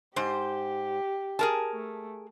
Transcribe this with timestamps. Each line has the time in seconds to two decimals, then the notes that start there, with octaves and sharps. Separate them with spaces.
0.16 G#2 G4 C5
1.39 G#4 A#4 A5
1.72 A3